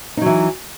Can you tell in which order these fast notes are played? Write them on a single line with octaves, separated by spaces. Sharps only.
D#4 F#3 E3